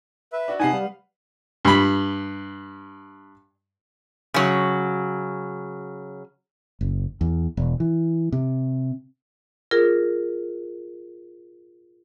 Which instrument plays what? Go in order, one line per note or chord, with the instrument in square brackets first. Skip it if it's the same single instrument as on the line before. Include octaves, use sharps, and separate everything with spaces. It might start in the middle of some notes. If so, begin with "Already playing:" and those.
[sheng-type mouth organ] B4 E5
[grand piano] D4 F#4
[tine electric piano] C3 G#5 [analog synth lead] D#4 [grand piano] B4 F#5 C7 [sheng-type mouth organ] A5 D#6
[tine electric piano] G3 [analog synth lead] F5
[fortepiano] G2 B5
[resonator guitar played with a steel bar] C#3 F#3
[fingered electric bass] F#1
E2
E1
E3
C3
[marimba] F4 G#4 A#4